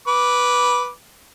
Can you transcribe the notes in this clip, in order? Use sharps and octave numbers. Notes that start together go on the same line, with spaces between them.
B4 D6